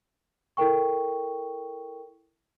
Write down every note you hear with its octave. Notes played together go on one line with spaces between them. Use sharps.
E4 A4 A#4 G5 C#6